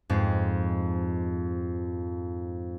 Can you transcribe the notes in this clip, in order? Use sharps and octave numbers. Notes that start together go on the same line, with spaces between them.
F2 G#2 G#3